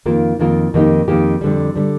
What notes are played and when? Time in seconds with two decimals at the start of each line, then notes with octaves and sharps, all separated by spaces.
0.06 F2 D#3 A#3 F4 A#4
0.40 F2 D#3 A#3 F4 A#4
0.74 F2 D#3 A#3 D#4 G4
1.08 F2 D#3 A#3 D#4 G4
1.41 F2 D3 G3
1.76 D3 G3